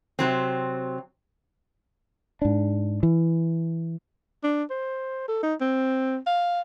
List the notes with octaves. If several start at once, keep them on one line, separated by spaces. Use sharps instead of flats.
C3 F#3 C4
G#2 D4
E3
D4
C5
A4
D#4
C4
F5